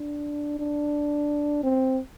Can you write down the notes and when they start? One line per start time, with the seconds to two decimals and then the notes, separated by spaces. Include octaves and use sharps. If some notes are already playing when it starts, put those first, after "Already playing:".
Already playing: D4
0.59 D4
1.63 C4